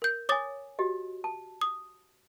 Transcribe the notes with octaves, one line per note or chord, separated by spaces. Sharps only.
A#4 G6
C#5 G#5 D6 D#6 A6
F#4 G4 D#5
A5
D#6